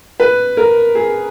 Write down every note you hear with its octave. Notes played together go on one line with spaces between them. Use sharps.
B4
A#4
G#4